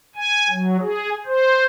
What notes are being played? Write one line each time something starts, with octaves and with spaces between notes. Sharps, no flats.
G#5
F#3
G#4
C5